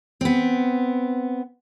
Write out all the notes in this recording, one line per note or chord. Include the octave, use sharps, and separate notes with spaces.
B3 C4